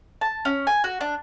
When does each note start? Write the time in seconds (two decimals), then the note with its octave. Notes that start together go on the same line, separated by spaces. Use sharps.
0.21 A5
0.45 C#4
0.67 G#5
0.84 F#4
1.01 D4